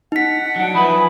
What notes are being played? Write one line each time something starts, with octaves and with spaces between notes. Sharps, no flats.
D#4 F#5 B6
F#3 D4
F3 E4 B4 G#5 B5 D#6